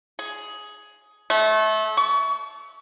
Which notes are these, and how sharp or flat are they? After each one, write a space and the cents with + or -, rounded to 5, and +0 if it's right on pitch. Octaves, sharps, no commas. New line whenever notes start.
G#4 +10
A3 -25
C#6 +30